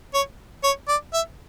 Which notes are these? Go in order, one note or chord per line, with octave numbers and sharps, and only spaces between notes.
C#5
C#5
D5
E5